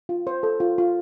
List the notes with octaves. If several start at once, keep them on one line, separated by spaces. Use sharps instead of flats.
F4
C5
A4
F4
F4